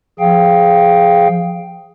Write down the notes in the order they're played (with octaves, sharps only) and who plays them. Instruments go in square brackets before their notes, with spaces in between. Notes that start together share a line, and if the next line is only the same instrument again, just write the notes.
[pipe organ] F3 G#4 F5 G5